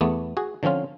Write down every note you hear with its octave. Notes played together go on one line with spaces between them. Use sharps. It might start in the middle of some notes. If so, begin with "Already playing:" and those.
E2 A3 B3
F#4 G#4
D3 F3 C4 C#4 F4